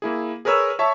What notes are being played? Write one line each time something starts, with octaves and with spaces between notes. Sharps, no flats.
A#3 E4 G#4
G#4 A#4 B4 C#5 E6
C#5 E5 A5 C#6